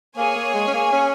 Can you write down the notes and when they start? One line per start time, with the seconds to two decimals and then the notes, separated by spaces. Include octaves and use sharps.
0.16 A#3 G#4 C#5 G#5
0.36 A#3
0.54 G#3
0.68 C#4
0.74 A#3
0.92 C#4